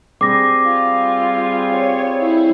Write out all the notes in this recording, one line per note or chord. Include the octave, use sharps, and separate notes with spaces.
G3 C4 G#4 D6 A#6
F4
C#5
E4